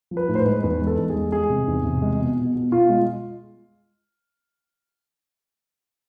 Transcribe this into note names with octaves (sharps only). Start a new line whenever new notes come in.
F3
B4
A2
C5
B4
G#3
E2 B4
G#3
A4
E2
G#4
G#3
G#3 G#4
C3
E2
C3
G#3
B2
B2
B2
B2 F4
G#3